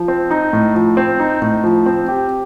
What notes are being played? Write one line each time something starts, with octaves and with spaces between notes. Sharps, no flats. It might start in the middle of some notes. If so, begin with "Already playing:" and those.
Already playing: F3
C4
D#4
A2
F3
C4
D#4
A2
F3
C4
G4